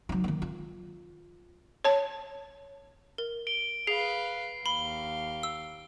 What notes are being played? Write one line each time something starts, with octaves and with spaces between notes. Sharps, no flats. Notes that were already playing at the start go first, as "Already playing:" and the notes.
F#3 D#4
D#3 A#3
F4
C#5 A5
A#4
D7 G7
G#4 B4 F5 C7
D#2 F5 B5 G7
E6